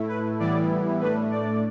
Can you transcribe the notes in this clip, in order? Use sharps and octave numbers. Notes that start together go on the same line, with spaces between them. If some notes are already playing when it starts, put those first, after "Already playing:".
Already playing: A2 A3 E4
B4
A2 E3 G3 B3 E4 D5
A2 A3 D4 B4
D5